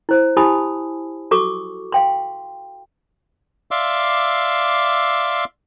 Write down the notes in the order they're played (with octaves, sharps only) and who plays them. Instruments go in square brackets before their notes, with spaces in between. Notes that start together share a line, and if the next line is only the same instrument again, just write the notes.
[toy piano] E4 C5
E4 G4 G#5 A5 B5 D#6
F#4 A4 C#6 D6
F5 G5 C6
[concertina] D5 E5 F5 C6 D6 E6